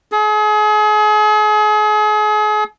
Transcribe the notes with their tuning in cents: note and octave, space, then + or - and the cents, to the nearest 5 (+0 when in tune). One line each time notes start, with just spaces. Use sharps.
G#4 +35